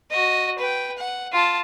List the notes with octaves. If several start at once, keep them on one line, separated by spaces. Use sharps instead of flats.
F#4 D#5
B4 G5
F#5
F4 A5